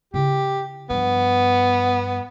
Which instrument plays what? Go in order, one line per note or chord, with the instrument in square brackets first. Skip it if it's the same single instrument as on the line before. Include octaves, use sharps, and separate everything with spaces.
[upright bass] C#3 E4 [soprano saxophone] G4
[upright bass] G2 F3 [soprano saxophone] B3